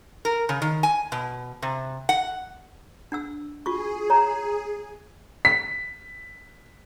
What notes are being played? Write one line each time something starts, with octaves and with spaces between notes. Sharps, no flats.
A#4
C#3
D#3
G#5
B2
C3
F#5
D4 F#5 E6
F4 F#4 G#4 C#6
C#5 A#5
B6